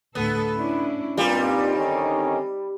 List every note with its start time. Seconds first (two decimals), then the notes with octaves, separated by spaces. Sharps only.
0.15 D2 A2 B3 A4
0.55 C#4 D4 E4
1.17 G2 A#2 G3 C4 D#4
1.76 D3 D#3 C#4